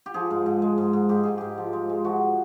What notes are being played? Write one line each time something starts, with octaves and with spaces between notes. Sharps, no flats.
G4
F3 G#4
G#2
G#2
G#3
G#2
G#2
G#2 G4
G#2 G#4
G#2 G4
F3
G#3
G#3
F3 F#4